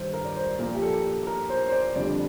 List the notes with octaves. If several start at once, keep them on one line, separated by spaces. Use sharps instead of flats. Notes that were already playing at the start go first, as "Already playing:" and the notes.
Already playing: G2 D#3 G3 C5
A#4
D5
C5
A#2 F3 A#4
G4
A4
A#4
C5
C5
D5
F2 D3 G3 D5